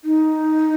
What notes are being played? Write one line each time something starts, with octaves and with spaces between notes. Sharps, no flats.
D#4